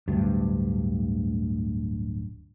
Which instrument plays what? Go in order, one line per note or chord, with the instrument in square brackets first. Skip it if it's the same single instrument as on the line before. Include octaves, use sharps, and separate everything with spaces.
[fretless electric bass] D1 D2 G2